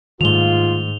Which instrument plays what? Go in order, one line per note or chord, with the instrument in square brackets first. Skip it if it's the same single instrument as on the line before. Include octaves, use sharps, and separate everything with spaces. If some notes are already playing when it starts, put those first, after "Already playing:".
[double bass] G#2 [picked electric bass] D#3 G3 A3 [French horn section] F4 [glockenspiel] F7 G7